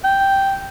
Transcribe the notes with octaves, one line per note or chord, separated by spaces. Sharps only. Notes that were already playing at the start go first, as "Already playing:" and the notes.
G5